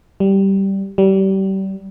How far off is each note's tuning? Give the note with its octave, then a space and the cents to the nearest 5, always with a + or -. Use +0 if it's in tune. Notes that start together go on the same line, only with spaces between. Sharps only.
G3 -10
G3 -30